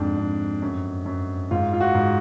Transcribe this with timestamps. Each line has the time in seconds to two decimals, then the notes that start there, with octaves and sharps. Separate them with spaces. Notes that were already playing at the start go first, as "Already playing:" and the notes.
Already playing: F2 G#2 D4
0.17 F2
0.62 F#2
1.06 F#2
1.51 G#2 F4
1.73 F4
1.80 F#4
1.95 G#2